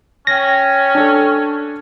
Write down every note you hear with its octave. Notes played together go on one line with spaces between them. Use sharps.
C#4 C#5 G5 A#6
D4 A4